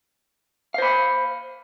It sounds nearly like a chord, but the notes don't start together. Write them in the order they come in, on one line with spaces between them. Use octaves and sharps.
F5 C5 B5